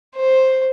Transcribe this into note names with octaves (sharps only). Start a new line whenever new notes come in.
C5